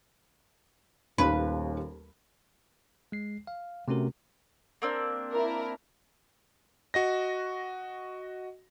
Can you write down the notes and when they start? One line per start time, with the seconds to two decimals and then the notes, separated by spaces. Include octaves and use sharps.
1.18 D#1 D#2 B4 F5
3.12 G#3 C7
3.47 F5
3.88 C3 A3 C#4 F#4 A#4
4.82 A#3 C4 D4
5.32 E4 A#4
6.94 F#4 D#5 A#6